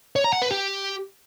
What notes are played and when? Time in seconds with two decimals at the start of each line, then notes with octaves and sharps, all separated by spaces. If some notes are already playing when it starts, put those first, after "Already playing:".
0.16 C#5
0.24 A#5
0.33 F#5
0.42 B4
0.50 G4